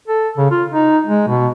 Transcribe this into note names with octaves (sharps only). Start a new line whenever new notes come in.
A4
C#3
F4
D#4
G#3
B2